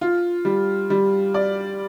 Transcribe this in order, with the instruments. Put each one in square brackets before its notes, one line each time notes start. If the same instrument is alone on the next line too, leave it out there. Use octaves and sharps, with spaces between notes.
[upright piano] F4
G3
G3
D5